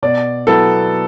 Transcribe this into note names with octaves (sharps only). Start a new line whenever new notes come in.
B2 D5
F#3 B3 E4 A4